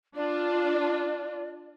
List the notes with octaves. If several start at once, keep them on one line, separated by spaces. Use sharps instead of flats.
D4 F4 D5